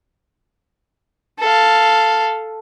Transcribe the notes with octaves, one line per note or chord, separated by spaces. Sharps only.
A4 F5